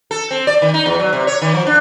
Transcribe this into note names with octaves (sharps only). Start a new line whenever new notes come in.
A4
C4
D5
D#3
D#4
E2
F#3
C3
C#5
D#3
F3
D4